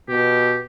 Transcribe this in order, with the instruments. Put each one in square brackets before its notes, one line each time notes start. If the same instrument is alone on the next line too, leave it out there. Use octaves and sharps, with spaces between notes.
[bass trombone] B2 [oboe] G4